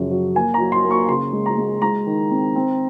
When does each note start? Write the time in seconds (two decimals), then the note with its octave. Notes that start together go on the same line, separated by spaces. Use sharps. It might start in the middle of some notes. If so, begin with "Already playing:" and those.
Already playing: F#2 C#3 F3
0.11 F#3
0.35 A#3 G#5
0.54 A#5
0.60 F#3
0.72 C6
0.84 A#3
0.91 C#6
1.08 C#3 C6
1.33 G#3
1.46 A#5
1.57 G#3
1.82 G#3 A#5
2.06 D#3
2.31 C4
2.55 C4